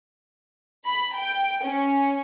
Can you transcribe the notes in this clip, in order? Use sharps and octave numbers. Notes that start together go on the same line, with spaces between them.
B5
G5
C#4